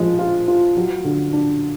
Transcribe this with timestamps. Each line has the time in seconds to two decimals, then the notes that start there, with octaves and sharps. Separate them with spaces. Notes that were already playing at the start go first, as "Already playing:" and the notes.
Already playing: F3 G#3
0.19 F4
0.48 F4
0.77 F#3
1.04 D3
1.33 D4